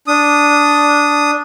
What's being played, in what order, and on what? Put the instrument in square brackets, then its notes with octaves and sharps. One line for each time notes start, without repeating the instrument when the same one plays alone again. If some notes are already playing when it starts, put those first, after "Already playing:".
[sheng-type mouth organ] D4 D#6